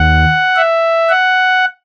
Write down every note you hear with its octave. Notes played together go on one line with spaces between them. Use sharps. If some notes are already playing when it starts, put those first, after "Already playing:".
Already playing: D#2 F#5
E5
F#5